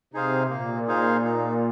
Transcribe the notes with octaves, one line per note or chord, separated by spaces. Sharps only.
C3 D#4 G#4 C5 F5
A#2 A#3
D#4 G#4 C5 F5
D#4